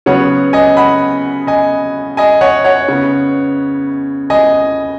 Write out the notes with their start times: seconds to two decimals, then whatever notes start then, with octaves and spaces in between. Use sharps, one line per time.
0.06 C#3 F#3 B3 C#5 F#5
0.53 D#5 G#5
0.77 F#5 B5
1.47 D#5 G#5
2.17 D#5 G#5
2.41 C#5 F#5
2.64 C#5 F#5
2.88 C#3 B3
4.30 D#5 G#5